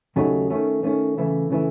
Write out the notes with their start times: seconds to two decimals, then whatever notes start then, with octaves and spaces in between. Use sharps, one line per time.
0.16 D#2 C#3 F#3 A3 D#4
0.50 D#3 A3 C#4
0.83 D#3 A3 C#4
1.17 C#3 E3 A3 E4
1.50 C#3 E3 A3 E4